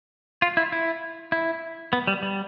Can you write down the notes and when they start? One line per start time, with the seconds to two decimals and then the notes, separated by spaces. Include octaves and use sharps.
0.42 F4
0.57 E4
0.72 E4
1.32 E4
1.93 B3
2.07 G3
2.23 G3